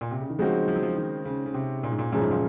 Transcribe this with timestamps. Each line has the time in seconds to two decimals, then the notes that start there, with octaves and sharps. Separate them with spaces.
0.01 A#2
0.11 C3
0.20 C#3
0.30 D#3
0.39 C#3 F3 G#3 C4 D#4 F#4
0.68 F3
0.76 F#3
0.83 F3
0.97 D#3
1.25 C#3
1.46 C#3
1.54 C3
1.83 A#2
1.92 G#2
1.99 A#2
2.12 F#2 A#2 C#3 F3 G#3
2.22 G#2
2.31 A#2